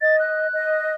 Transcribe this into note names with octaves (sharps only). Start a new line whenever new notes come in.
D#5 A6
F#6
D#5